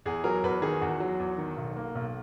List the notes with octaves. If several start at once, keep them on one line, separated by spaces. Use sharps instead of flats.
E2 G#4
F#3 A#4
E2 B4
D#3 G#4
E2 F#4
F#3
E2
D#3
B1
A#3
B1